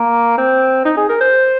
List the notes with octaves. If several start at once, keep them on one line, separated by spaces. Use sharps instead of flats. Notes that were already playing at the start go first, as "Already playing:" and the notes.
Already playing: A#3
C4
D#4
G#4
A#4
C5